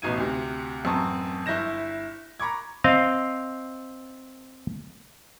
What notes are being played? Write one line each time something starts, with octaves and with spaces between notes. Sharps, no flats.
A1 B2 D#4 G#6 D#7
D2 C3
A1 F#2 C4 A5 C#6 D#6
G1 E4 G6 A#6 E7
A#5 B5 C#6 D6 G#6
C4 D#5 F5